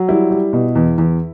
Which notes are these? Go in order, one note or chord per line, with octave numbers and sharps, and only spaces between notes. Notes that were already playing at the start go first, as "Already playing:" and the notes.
Already playing: F#3
G3 E4
G3
B2
E2
E2